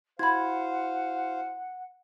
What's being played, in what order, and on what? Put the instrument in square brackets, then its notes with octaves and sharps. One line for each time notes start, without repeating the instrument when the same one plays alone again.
[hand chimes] E4 F#4 C6 [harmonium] C5 F5 [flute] F#5 [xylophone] B5 G#6